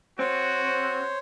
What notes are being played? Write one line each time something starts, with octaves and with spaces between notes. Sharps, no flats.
C4 F#4 C5 C#5